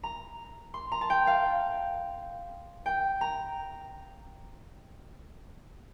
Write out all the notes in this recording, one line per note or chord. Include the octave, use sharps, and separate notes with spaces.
A#5
C6
A#5
A5
G5
F5
G5
A#5